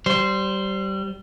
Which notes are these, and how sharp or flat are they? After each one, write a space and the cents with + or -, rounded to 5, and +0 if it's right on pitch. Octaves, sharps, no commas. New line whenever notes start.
G3 -20 C5 +0